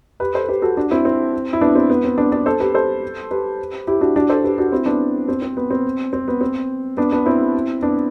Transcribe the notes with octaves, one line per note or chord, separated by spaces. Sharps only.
G4 B4
A4 C5
A4
G4 B4
F#4 A4
D4 F#4
C4 E4
C4
E4
B3 D4
C4
B3
C4
B3 D4
B3 D4
A4 C5
G4 B4
A4 C5
G4 B4
E4 G4
D4 F#4
D4 F#4
A4 C5
G4 B4
D4 F#4
C4 E4
B3 D4
C4
C4
B3
C4
C4
B3
C4
B3 D4
B3 D4
C4 E4
B3 D4